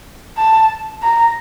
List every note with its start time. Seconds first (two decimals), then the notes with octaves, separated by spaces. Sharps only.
0.37 A5
1.03 A#5